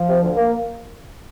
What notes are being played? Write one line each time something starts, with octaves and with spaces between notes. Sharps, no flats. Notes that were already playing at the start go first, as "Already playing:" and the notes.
Already playing: F3
C3
D2
A#3